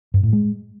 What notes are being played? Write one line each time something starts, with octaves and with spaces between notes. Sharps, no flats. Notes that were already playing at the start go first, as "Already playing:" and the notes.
G2
A2
G#3